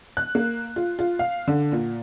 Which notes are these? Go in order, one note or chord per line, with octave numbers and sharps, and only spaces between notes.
F#6
A#3
F4
F4
F5
D3
A#2